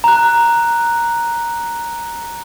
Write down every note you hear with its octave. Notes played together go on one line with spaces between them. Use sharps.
A#5 F#6